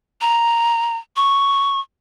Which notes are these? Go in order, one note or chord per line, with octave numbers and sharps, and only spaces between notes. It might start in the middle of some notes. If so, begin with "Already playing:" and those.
A#5
C#6